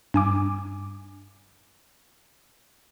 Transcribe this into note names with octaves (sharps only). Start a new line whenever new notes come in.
G2 G#5 D6